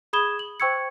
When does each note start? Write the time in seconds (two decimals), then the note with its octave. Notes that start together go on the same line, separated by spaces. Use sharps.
0.13 G#4 B5 D#6 G#6 E7 G7
0.39 F#7
0.60 C5 G5 C#6 E6 G#6 C#7